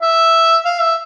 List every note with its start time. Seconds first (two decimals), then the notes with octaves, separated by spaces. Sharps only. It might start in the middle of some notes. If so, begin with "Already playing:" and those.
0.02 E5
0.65 F5
0.81 E5